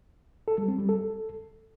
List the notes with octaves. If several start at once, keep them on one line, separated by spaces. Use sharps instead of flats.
A4
G3
C4
G3
A4